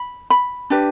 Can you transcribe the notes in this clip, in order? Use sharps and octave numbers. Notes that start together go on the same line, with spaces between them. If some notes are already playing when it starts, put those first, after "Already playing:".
Already playing: B5
B5
D4 G4 B4